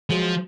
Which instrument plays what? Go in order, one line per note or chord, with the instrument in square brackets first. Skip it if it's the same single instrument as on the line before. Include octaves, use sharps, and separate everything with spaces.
[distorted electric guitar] F3 [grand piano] F#3 G#3